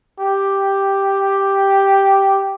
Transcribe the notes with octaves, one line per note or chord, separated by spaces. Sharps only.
G4